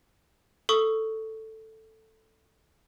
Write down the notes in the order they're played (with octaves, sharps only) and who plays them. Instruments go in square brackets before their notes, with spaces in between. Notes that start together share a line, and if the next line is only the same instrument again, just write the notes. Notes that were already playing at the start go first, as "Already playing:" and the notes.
[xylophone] A4 C#6 D#6